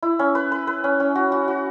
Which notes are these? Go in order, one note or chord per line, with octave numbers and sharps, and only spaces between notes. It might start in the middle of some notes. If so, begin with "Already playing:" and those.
E4
C#4
B4
B4
B4
C#4
C#4
F#4
F#4
F#4